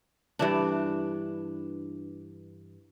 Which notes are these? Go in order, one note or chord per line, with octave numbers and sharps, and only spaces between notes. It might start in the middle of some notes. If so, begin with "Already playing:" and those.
G2 E3 D4